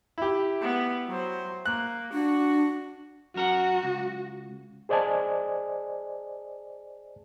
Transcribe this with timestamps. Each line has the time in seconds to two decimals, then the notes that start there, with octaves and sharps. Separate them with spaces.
0.18 E4 G4
0.61 B3
1.08 F#3 C5
1.66 A#3 F#6
2.13 D4 F#4
3.36 F#2 F#4 A#4 F#5
3.83 C#2
4.89 G#4 C5 D5 D#5 G#5 A5